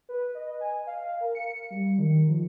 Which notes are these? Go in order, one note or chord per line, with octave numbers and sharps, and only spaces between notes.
B4
D#5
G#5
F5
A#4
C#7
G3
D#3
F3